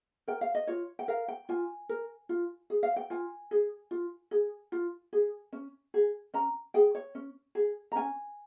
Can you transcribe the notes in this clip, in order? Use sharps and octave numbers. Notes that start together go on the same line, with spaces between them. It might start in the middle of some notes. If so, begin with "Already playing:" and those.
A#4 G5
F5
D#5
F4 C#5
G5
A#4 F5
G5
F4 G#5
A#4
F4
G#4
F5
G5
F4 G#5
G#4
F4
G#4
F4
G#4
C#4
G#4
C#4 A#5
G#4 G5
C#5
C#4
G#4
A#5
C#4 G#5